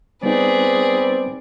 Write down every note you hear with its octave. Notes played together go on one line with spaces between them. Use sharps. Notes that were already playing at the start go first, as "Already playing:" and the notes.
G3 B3 C4 D#4 G#4 B4 D5